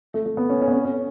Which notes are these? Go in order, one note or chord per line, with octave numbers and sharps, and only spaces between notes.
A3
A3
B3
C#4
C#4
B3
C#4
C#4